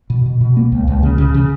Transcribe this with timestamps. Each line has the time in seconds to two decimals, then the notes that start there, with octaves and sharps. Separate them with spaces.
0.10 B2
0.26 B2
0.41 B2
0.57 A#3
0.72 C#2
0.87 C#2
1.03 C#3
1.18 C#3
1.34 C#3